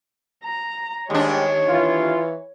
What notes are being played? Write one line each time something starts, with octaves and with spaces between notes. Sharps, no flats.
A#5
D#2 G#2 G3 G#3 D4 G4 C#5
E3 F4